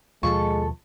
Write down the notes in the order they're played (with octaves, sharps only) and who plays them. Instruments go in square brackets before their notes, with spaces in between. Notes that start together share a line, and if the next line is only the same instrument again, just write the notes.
[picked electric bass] D#2 B2 F3 [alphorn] G#3 [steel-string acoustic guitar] F4 A4 [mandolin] C#6